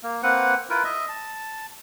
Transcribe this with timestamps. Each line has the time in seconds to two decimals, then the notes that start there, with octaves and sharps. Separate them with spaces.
0.03 A#3
0.23 A#3 C4 B4 F#5
0.70 E4 F4 A#4 B4
0.84 D#5 E5
1.09 A5